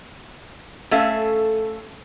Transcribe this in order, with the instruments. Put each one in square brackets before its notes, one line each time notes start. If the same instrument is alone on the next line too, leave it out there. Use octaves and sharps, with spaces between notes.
[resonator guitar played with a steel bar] A3 C#4 A4 E5 F5